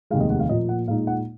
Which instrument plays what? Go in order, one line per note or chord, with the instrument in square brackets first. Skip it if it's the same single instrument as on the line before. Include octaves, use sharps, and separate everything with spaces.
[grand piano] F1 D#2 D#3 G#3 F5
D#5
F#5
F5
A#2 F3 A#3 D#5
F#5
A#2 G#3 D#4 F5
F#5